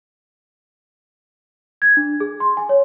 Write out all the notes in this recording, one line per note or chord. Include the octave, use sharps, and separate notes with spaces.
G#6
D4
G#4
C6
G#5
C#5